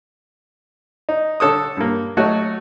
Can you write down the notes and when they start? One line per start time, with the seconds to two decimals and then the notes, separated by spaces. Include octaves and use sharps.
1.09 D#4
1.40 D3 A4 C#5 D#6
1.77 G2 A#3
2.17 F#3 A3 F#4 C#5 D#5